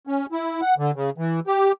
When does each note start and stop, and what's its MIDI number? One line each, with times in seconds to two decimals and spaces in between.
0.07 0.26 61
0.32 0.61 64
0.62 0.74 78
0.78 0.91 50
0.96 1.10 49
1.18 1.40 52
1.47 1.72 67